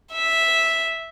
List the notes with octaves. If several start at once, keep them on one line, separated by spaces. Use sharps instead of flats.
E5